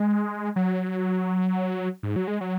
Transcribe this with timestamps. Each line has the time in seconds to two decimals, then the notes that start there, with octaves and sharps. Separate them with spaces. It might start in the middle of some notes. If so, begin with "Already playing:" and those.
Already playing: G#3
0.56 F#3
2.03 G#2
2.16 F#3
2.28 G#3
2.41 F#3